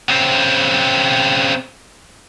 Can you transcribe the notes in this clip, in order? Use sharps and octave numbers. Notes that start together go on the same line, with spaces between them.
C#3 C4